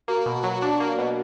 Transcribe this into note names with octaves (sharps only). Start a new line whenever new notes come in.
A#3 F#4
B2
F#3
D4
A#3
B2